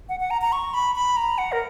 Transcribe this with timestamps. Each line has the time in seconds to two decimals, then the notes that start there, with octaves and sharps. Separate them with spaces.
0.09 F#5
0.20 F#5
0.31 A#5
0.41 A#5
0.52 C#6
0.74 B5
0.95 B5
1.17 A#5
1.38 F#5
1.52 A#4